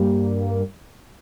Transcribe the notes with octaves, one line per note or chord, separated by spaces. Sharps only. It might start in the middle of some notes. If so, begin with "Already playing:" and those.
Already playing: G2 G3 A#3